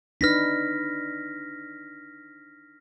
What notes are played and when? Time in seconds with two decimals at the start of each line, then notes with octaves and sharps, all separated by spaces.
0.21 D4 D#4 B4 F6 A#6 B6